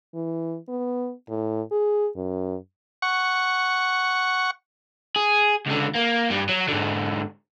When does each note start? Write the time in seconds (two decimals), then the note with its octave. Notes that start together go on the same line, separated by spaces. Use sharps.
0.14 E3
0.68 B3
1.29 A2
1.71 G#4
2.16 F#2
3.02 F#5 C#6
5.16 G#4
5.66 C#2 D3
5.95 A#3
6.30 G2 G3
6.49 F#3
6.68 G#2 D3